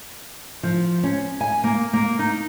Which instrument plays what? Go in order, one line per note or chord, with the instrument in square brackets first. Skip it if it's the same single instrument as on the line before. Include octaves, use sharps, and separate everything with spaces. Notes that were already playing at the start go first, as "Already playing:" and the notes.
[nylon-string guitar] F3
C#4
G#5
A#3
A#3
D#4